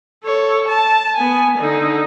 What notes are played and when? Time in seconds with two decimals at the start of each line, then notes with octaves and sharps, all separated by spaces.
0.25 A4 C#5
0.68 A5
1.17 B3 G#5
1.58 D3 D#4